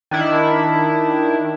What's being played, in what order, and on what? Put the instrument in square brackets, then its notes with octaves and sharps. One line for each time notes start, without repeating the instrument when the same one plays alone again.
[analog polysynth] D#3 D4 E4